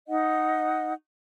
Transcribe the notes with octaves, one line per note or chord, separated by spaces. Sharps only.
D#4 D#5 F#5